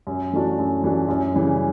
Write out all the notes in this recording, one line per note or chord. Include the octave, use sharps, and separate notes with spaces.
F#2
E3 A3 D4 F#4
F#2
E3 A3 D4 F#4
F#2
C#3 E3 G3